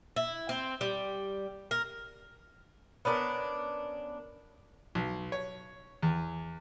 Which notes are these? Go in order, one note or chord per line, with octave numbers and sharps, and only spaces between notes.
E4
C4
G3
A#4
B3 C#4 D4 A#4
B1
C#5
E2